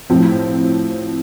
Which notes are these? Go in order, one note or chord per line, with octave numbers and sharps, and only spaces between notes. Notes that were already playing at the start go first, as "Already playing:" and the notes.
A2 F3 C4